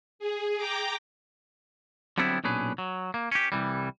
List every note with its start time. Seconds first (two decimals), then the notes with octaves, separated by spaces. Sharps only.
0.19 G#4
0.57 G5 A#5 D6
2.18 D3 F#3 G3 B3 C4 E4
2.44 B1 A#2 C#4 D4 G#4 B4
2.78 F#3
3.14 A#3
3.32 C#4 G4
3.52 C2 E3 G3